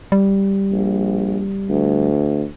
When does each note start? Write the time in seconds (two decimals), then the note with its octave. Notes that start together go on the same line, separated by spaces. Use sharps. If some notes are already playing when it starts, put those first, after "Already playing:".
0.12 G3
0.72 A#1
1.69 D2